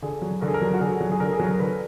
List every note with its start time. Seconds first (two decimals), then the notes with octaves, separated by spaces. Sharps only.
0.02 D3 G#4
0.22 F#3
0.41 D3 A#4
0.48 G#4
0.54 A#4
0.61 F#3
0.74 F#4
0.81 D3 G#4
1.00 F#3
1.12 G#4
1.20 D3 A#4
1.33 G#4
1.39 F#3
1.46 A#4
1.59 D3 B4